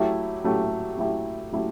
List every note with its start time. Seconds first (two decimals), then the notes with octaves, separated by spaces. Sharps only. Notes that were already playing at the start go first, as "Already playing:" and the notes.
Already playing: F#3 A3 E4 G4
0.44 F#3 A3 E4 G4
0.98 F#3 A3 E4 G4
1.52 F#3 A3 E4 G4